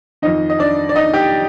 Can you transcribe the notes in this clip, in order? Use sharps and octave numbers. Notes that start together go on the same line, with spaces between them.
F2 D#3 D#4 D#5
D#5
D4 D5
D5
D#4 D#5
G4 G5